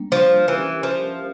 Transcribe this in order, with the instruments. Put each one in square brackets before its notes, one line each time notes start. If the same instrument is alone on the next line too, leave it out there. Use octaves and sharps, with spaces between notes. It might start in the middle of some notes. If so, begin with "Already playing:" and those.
Already playing: [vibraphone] G3 A#3 D4
[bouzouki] F3
[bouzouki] E3 [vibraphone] C#4 G4 A#4 E5
[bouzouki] F3